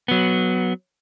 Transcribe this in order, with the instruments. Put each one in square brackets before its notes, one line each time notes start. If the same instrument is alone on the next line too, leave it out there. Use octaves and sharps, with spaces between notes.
[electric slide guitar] F#3 B3